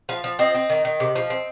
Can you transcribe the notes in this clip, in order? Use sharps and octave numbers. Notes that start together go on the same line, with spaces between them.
F3 F5
F3
C4 D#5
C4
D#3
D#3
C3
F3
C4